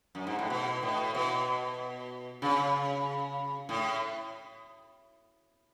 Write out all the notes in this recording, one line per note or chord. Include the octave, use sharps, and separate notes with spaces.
F#2
G#2
A2
B2
A2
B2
C#3
A2